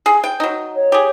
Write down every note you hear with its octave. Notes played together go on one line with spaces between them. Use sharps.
G#4
G5
F#3 D#4
C#5
G4 G#4